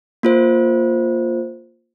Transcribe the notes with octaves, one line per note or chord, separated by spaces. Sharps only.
A#3 F4 C5